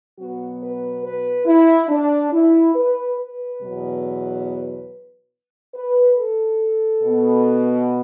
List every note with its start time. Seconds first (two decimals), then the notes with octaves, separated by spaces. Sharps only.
0.17 B2 F#3 B3 F#4
0.60 B4
1.03 B4
1.46 E4
1.89 D4
2.31 E4
2.74 B4
3.17 B4
3.60 E2 B2 F#3
5.74 B4
6.17 A4
7.03 B2 B3